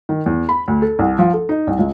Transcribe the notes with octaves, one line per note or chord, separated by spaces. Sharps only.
D#3
E2
B5
D2
A4
C2
F3
A4
D#4
C2
C#2